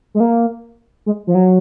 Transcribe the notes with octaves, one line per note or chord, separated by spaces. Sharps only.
G#3
A#3
G#3
F3
F#3